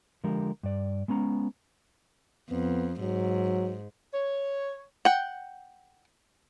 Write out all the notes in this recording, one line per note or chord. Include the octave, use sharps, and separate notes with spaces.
D3 F3 G#3 G4 A#4
G2 D5
G#3 B3 C#4 A#5
F2 B3
G#2 F#3
C#5
F#5 G5